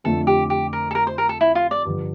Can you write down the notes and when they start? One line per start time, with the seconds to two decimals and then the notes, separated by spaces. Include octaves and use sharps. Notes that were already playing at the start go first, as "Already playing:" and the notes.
0.04 F2 D3 A3 D4 F4 A4
0.27 G4
0.50 G4
0.73 A#4
0.91 A4
0.95 A#4
1.07 C5
1.18 A#4
1.29 A4
1.41 E4
1.55 F4
1.71 D5
1.85 G2 D3 F3